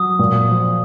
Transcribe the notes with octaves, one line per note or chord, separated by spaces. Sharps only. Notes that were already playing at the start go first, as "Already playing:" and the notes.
Already playing: F#3 D#6
A#2
F3